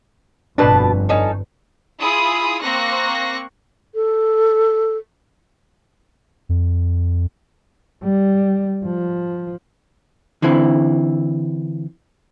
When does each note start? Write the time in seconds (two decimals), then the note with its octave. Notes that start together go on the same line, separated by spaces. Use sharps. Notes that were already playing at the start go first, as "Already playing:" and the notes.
0.58 G1 F2 B2 D4 B4 A5 B5
1.09 C#4 D#4 A4
2.01 E4 F4 G#4 B5 D#6
2.62 A#3 C4 C#6 F#6 A#6
3.95 A4
6.49 F2
8.03 G3
8.85 F3
10.42 D3 E3 C4 E4